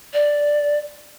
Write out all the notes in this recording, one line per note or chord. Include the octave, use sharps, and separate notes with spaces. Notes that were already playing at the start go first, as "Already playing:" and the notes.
D5